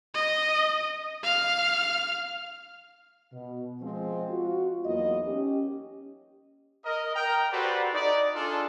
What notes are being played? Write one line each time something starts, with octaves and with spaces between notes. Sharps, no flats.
D#5
F5 F6
B2
F3 G#3 C4
F4 F#4
E2 F#3 A#3 D#4 D#5
C#4 G4
A#4 D#5
A#4 G5 A#5
F#4 G4 A4 B4 C5 D5
D#4 D5
D4 F4 G#4 A4